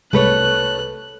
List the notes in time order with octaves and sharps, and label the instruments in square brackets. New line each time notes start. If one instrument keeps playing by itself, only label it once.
[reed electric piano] C2 B4 [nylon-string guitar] A3 C#5 [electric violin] F#6